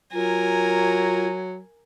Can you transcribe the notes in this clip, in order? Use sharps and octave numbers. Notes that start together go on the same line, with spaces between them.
F#3 F4 A#4 G#5